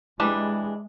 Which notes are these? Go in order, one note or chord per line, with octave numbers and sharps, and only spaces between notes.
E3 G3 G#3 D4